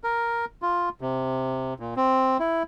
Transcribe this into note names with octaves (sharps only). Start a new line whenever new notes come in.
A#4
F4
C3
A#2
C4
E4